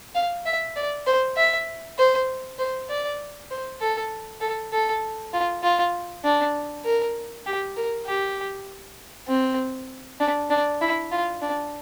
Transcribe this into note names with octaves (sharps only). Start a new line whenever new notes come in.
F5
E5
D5
C5
E5
C5
C5
D5
C5
A4
A4
A4
F4
F4
D4
A#4
G4
A#4
G4
C4
D4
D4
E4
F4
D4